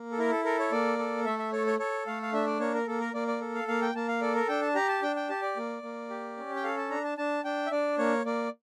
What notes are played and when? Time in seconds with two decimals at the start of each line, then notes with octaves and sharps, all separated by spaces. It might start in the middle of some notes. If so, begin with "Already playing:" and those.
Already playing: A#3
0.12 A4
0.18 E4 A#4
0.31 A4
0.45 A4 A#4
0.59 C#5
0.72 A#3 D5
0.99 A4
1.26 A3 E5
1.39 E5
1.53 A4 C#5
1.67 C#5
1.79 A4 C#5
2.07 A3 F5
2.23 F5
2.33 D4 E5
2.47 D5
2.60 A#3 C#5
2.74 A#4
2.87 A#3 A4
3.00 A#4
3.14 A#3 D5
3.28 D5
3.41 A4
3.55 F5
3.68 A#3 F5
3.82 G5
3.95 A#3 A5
4.08 F5
4.21 A4 D5
4.35 A#4
4.48 D4 G5
4.62 A5
4.75 G4 A#5
4.88 A5
5.02 D4 G5
5.16 G5
5.29 G4 A5
5.42 D5
5.57 A#3
5.82 A#3
6.10 G4
6.37 C#4
6.55 G5
6.64 A4 F5
6.77 A5
6.90 D4 A#5
7.04 A5
7.18 D4 A5
7.44 D4 G5
7.66 E5
7.71 D4 D5
7.98 A#3 C#5
8.25 A#3 D5